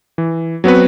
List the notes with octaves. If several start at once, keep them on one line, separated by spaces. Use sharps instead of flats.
E3
F#3 B3 C4 F#4 B4